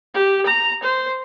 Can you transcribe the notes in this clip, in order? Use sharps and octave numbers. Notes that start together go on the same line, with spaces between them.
G4
A#5
C5